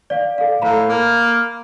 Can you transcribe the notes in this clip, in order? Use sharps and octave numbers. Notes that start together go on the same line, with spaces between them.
D5 F5
A4 F5
A2 F5 A#5 B5
A#3